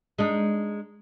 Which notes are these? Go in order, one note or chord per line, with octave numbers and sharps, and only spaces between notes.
G#3 D4 D#4